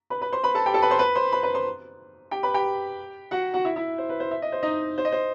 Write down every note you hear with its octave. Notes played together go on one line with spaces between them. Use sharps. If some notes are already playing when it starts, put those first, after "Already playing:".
B4 B5
B4 B5
C5 C6
B4 B5
A4 A5
G4 G5
A4 A5
B4 B5
C5 C6
B4 B5
C5 C6
B4 B5
B4 B5
C5 C6
G4 G5
B4 B5
G4 G5
F#4 F#5
F#4 F#5
E4 E5
E4 E5
C5
B4
C5
E5
D#5
C5
D#4 D#5
C5
D#5
C5